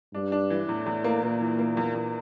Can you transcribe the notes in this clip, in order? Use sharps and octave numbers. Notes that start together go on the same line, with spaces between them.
G2 D4
D4
E3
E2 A2
E2
A#3
A#2 A#3
E3
A#3
E2
E2